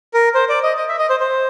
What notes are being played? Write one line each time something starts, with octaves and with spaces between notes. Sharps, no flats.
A#4
C5
D5
D#5
D#5
E5
D#5
C5
C5